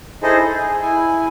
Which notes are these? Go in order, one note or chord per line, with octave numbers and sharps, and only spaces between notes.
D#4 E4 G#4 A4 C5 D#5
G#4
E4 G#5